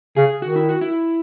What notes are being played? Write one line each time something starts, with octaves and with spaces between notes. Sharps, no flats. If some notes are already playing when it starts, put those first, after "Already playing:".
C#3 G#4
D#3 F#4
E4
F#4
E4